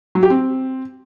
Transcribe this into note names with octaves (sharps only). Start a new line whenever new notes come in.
F#3
G4
C4